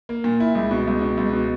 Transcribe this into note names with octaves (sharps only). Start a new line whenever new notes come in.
A#3
A#2
E4
C#2
B2
C#2
B2
C#2
B2